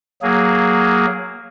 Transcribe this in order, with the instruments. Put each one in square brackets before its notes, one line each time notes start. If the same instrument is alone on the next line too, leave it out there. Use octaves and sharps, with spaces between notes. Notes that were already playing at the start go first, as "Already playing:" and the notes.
[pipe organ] F#3 A#3 G#4